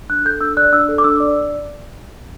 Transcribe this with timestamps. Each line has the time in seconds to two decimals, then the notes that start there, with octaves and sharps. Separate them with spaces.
0.09 D4 F#6
0.25 A4 G6
0.41 D4 E6
0.57 D5 F#6
0.72 D4 E6
0.88 A4
0.98 D6
1.04 D4 E6
1.20 D5